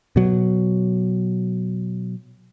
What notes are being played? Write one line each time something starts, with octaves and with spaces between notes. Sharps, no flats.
B2 F#3